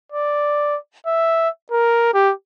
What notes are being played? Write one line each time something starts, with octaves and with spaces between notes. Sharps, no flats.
D5
E5
A#4
G4